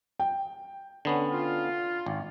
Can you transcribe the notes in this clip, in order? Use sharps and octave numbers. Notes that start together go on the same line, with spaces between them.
G5
D3 B3 C#4
F4
G#1